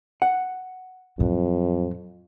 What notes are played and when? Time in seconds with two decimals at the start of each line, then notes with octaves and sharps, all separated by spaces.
0.22 F#5
1.19 F2 A2 F#3